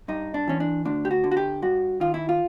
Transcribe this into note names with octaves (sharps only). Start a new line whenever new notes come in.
G2 D#4
D4
E3 C#4
D4
D2 D4
G4
F#4
D3
F#4
G4
G2 F#4
D#3 F4
E4
F4